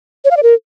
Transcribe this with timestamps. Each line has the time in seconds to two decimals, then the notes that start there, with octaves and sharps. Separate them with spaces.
0.25 C#5
0.31 F5
0.37 D5
0.43 A#4